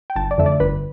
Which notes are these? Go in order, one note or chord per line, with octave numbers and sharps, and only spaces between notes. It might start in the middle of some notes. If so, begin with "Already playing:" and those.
G5
G1 A5
D5
F2 D3 A3 E5
D5
G1 B4